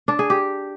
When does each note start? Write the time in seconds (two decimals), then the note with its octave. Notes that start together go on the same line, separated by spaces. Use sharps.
0.08 D4
0.19 G#4
0.30 G4